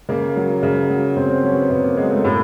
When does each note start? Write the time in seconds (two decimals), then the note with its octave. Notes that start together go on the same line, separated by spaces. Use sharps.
0.09 C#3 A#3
0.36 F#3
0.63 C#3
0.89 F#3
1.16 C#3 C4
1.30 C4
1.43 F#3 C#4
1.52 B3
1.56 C4
1.70 C#3 B3
1.83 A#3
1.97 F#3 G#3
2.11 A3
2.24 A2 A#3